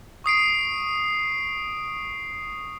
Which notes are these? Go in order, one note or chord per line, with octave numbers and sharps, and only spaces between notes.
C#6 D#6 C7 D7